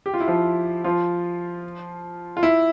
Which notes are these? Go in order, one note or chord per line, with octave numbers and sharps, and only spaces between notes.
G4
F4
E4
F3 F4
F3 F4
F4
E4